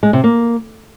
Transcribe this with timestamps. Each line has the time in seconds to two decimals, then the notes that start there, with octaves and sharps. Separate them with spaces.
0.03 G#3
0.13 C3
0.24 A#3